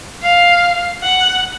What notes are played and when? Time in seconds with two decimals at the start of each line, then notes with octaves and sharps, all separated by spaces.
0.23 F5
1.03 F#5